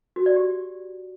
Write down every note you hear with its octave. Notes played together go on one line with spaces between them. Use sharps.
F#4
D5
G4